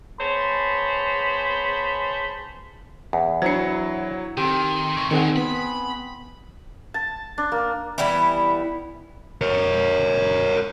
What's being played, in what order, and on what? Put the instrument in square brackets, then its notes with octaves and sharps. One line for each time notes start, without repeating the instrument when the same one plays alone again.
[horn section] B3 G#4 C5 C#5 A5 B5
[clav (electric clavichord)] E2
[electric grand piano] F#3 E4 C#7 [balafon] D4 C5
[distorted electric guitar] D#3 [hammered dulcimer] C4 A4 [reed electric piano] G4
[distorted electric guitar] G2 D#3 [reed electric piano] C#6
[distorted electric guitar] A2 D3 [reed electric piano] D#3 C4 [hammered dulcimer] G#4 F#5
[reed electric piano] B3 [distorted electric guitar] B5
[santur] A5
D4
A#3
[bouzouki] E3 G3 B3 E4
[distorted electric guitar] A#4 C#5